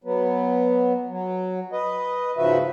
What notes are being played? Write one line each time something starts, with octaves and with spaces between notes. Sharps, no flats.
F#3 B3
F#3
B4 D#5
G#2 C#3 F3 F#4 B4 E5